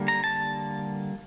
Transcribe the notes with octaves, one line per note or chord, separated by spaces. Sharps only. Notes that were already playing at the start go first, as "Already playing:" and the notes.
Already playing: D3 G3 A#3
A#5
A5